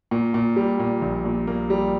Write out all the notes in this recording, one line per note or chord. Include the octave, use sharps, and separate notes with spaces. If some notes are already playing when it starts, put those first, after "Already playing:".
A#2
A#2
G3
A#2
A#1
A#2
A#3
G3